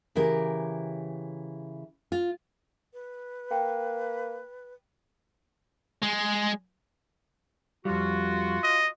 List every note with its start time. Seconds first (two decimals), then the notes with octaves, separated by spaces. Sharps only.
0.15 C#3 E3 G4 A#4
2.12 F4
2.93 B4
3.51 A#3 G5
6.02 G#3
7.85 F2 G3 F4 F#4
8.63 D#5